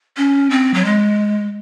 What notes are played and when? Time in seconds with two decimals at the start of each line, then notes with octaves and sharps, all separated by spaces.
0.17 C#4
0.50 C4
0.74 F#3
0.85 G#3